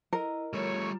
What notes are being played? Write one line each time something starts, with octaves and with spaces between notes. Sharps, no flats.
E4 A#4 D#5
G3 A3 F4 C#5 A#5